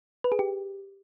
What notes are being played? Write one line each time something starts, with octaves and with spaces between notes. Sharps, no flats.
B4
G#4
G4